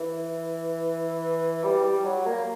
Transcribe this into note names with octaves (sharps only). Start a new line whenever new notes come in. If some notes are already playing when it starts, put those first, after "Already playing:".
Already playing: E3
G3
G3
F#3
A#3